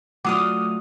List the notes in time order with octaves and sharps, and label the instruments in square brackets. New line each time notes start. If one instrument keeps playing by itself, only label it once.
[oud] F#3 F4 D5 [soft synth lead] A3 [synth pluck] F#5 D#6 F6 [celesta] D6